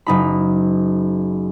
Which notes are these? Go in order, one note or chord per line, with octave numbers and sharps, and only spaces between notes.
F#1 D#4 B5